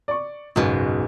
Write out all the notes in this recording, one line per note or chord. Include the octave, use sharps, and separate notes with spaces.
D5 C#6
F#1 B1 G#2 B2